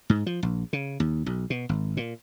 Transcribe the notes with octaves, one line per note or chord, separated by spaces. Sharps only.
G#2
F3
A#1
C#3
D#2
B1
B2
G#1
A#2